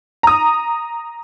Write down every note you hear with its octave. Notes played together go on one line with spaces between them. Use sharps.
A#5 D#6